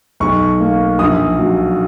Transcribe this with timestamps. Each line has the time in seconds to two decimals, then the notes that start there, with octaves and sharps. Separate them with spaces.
0.20 B1 C#6
0.60 A#3
0.99 A#1 D#6
1.39 F#3